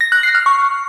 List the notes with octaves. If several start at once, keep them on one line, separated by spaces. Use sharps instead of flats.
A#6
F#6
C7
F6
C#6